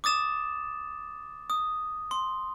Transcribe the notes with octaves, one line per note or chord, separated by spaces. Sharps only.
D6 D#6 A6 E7
D#6
C6